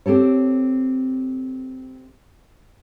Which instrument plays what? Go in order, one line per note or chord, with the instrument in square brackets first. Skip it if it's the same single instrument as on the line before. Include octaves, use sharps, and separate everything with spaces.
[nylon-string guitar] C4 G4 A4 C#5